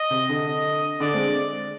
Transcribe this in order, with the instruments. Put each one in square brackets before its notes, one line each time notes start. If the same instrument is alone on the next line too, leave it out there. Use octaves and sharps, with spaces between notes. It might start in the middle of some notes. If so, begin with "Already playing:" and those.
Already playing: [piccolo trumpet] D#5
[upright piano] C3
D3
[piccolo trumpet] D#5
[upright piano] D3 [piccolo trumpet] D5
[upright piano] G#3 C4